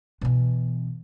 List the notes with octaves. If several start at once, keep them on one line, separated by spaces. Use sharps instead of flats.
B2 E3